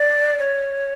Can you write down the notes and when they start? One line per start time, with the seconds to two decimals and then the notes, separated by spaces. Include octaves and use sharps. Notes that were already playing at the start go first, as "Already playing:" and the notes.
Already playing: D5
0.39 C#5